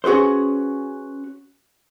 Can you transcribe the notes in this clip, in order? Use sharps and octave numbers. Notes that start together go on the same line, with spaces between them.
C#4 F#4 G#4 B4 C5